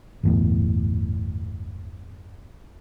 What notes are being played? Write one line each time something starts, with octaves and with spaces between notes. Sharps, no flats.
G1 E2 A2